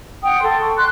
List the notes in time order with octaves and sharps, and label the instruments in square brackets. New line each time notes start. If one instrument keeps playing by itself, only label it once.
[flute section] F#5 G5 D#6
A4 C6
C#6
C6 F#6